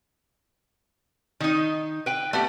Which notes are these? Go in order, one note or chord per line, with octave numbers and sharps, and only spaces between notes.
D#3 D#4
B4 G5
A3 B3 G4